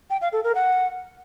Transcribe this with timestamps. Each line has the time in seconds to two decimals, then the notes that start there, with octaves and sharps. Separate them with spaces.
0.10 G5
0.21 F5
0.33 A4
0.44 A#4
0.55 F#5